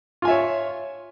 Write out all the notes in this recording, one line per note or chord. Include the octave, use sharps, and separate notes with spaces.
F4 C#5 E5 G#5